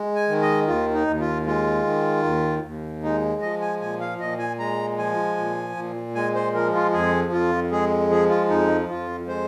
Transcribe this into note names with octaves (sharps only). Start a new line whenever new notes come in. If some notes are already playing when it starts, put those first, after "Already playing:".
Already playing: G#3
G#5
D#3
D#5
D#2 F4
D#4
D#2
F4
G#3 F4
D#3
D#2
D#2
G#3 D#4
F3 D#5
G#5
A#2 G#5
F5
A#2 D#5
G#5
G#3 A#5
F3 G#5
A#2
A#2
G#3 G#5
C5
F3 A#4
F4
F2 G#4
F2 F4
G#3 G#4
F3 G#4
F4
F2 D#4
F2 F4
G#3 C5